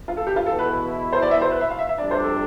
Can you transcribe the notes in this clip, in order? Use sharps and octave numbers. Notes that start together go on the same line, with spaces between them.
F4
A4
G4
F4
E2 B2 B3 E4 A4
B4
C5
D5
E5
C5
B4
E5
F5
E5
E5
F2 C3 G3 D4 D5
C5
A4